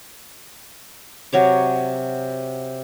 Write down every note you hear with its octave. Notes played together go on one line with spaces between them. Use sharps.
C3 F#3 C#5 D6